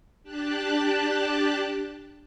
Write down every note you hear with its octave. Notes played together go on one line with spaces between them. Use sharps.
D4 G4 A5 F#6